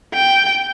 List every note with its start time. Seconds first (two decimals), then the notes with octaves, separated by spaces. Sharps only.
0.14 G5